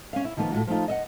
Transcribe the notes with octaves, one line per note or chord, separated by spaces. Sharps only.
C#4 F5
E4
D#3 F3 A#3 B3 F4
A2 F#3 F4 F#4
F3 A3 A#3 D#4 F4
D#5 E5 F#5